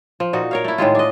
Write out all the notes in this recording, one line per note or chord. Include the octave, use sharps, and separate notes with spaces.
F3
A#2 D#4 F#4
A#4 C#5 F5
A3 E4
A2 D#3 G#3 F4
D4 D#5